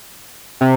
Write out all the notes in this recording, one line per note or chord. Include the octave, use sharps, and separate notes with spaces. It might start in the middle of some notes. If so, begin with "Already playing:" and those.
C3